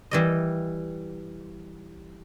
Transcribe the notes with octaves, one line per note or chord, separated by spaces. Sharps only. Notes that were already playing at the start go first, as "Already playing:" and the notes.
E3 G3 D#5